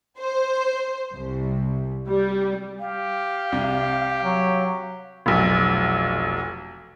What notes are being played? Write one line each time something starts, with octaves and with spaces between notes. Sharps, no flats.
C5
C2
G3
G4 F5
C2 C3
F#3
F1 B1